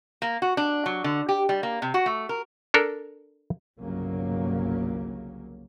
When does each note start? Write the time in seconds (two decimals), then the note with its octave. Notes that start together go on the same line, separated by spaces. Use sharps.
0.22 A#3
0.42 F#4
0.57 D4
0.86 F#3
1.04 D3
1.29 G4
1.49 G3
1.63 A#3
1.82 C3
1.94 F#4
2.06 A3
2.29 A#4
2.74 D4 A4 A#4
3.79 G1 C2 C#3 F#3 A#3